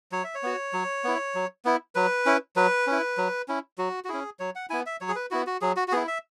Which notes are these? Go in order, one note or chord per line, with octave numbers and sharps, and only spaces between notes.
F#3 C#5
E5
C#5
B3 F#4
F#3
B3 E4
F#3
B3 E4
F#3 B4
C#4 E4
F#3 B4
C#4 E4
F#3
C#4 E4
F#3 F#4
F#4
C#4 E4 G#4
F#3 C#5
F#5
B3 E4 G#5
E5
F#3 C#5
G#4
B4
B3 E4 F#4
F#4
F#3 G#4
F#4
F#4
B3 E4 G#4
E5